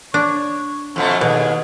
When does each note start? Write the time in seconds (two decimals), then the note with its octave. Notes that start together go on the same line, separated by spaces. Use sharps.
0.14 D4 C#5
0.96 F2 B2 A3 C4
1.21 D#2 B2 G#4